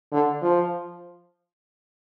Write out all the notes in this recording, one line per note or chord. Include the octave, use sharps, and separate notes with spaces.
D3
F3